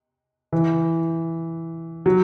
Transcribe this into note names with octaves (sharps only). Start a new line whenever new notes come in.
E3
F#3